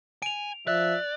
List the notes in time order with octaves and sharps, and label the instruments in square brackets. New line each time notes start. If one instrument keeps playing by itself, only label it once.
[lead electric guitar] G#5 [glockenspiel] D7 F7
[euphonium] F3 [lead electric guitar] D5 [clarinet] E5 [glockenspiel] F#6